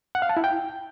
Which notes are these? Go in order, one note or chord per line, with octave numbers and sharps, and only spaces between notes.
F#5
F5
A5
E4
G5